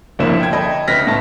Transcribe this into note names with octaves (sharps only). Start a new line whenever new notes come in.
G1 D2 F3 A#3 E4 E7
G5 G#6
A4 D#5 G5 B5
D2 B4 F6 A#6 B6
A2 A3 A5